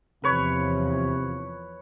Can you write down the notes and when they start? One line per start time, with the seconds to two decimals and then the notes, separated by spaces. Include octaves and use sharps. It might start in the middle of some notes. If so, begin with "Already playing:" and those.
0.24 E2 C3 F3 B4 C#5